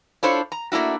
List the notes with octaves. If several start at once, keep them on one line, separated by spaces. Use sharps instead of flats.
D4 E4 F4 A4 C5 C#5
A#5
A3 A#3 D4 E4 F#4